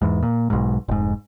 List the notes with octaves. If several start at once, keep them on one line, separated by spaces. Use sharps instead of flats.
E2 G#2
A#2
B1 G#2
F1 G#2